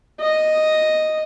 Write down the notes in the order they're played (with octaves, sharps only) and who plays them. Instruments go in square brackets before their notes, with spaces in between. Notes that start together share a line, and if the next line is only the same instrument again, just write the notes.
[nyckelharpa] D#5